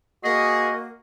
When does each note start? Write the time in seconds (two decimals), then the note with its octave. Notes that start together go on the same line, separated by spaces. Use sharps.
0.24 A#3 F#4 G#4 D#5